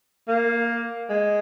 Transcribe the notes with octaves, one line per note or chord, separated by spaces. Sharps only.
A#3
G#3